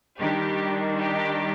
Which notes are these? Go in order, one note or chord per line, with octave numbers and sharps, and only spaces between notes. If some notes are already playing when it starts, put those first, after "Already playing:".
D#3 G3 D4 G4
G4